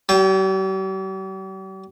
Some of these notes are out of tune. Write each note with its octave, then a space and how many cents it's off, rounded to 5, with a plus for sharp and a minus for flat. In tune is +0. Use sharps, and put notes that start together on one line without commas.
G3 -45 G5 +0